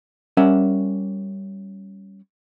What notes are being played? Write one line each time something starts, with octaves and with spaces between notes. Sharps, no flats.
G3 C#4 A#4 D5 E5 F#5